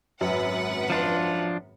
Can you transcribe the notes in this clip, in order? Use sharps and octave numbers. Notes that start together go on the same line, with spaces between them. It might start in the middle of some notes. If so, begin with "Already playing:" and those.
G#1 F#2 B4 F#5
F3 D4 F4